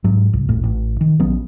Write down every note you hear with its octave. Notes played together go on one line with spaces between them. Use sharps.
G#2 F#3
C2
D#1 G#1 A2
A1
D#3
A#1 F#3 B3 C#4